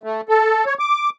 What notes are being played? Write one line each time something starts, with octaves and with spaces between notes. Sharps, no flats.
A3
A4
C#5
D6